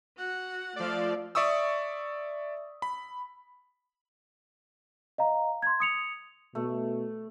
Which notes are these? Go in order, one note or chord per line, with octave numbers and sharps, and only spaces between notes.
F#4 F#5
F3 A3 D5 F5
D5 E5 C#6 D#6 E6
B5
D#5 F5 A#5
C6 G#6
D#6 C#7 F7
B2 A3